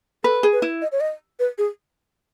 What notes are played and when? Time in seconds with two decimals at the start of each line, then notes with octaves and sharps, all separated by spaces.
0.24 A4 B4
0.43 G#4
0.53 B4
0.62 E4
0.82 D#5
0.92 C#5
1.00 D#5
1.39 B4
1.58 G#4